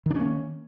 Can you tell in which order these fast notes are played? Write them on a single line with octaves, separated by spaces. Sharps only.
D#3 D4 C#4 A#3